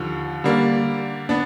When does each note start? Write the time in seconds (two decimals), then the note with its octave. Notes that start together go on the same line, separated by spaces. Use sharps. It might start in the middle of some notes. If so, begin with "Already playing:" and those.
Already playing: D#2 D3 F3
0.44 D3 G3 A#3 D4
1.29 B3 D4